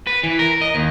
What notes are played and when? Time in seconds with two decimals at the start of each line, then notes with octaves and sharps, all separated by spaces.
0.07 B4
0.23 E3
0.39 A#4
0.61 D#5
0.75 D#2